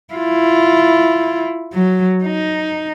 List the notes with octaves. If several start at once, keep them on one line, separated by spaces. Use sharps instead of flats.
E4 F4
F#3
D#4